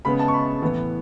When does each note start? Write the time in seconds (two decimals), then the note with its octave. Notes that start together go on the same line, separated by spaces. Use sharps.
0.05 C#3 G#3 B3 B5
0.19 A5
0.28 C#6
0.34 B5
0.62 A2 E3 B3